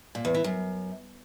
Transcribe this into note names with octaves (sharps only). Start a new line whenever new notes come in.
A#2
E2
E3
F#2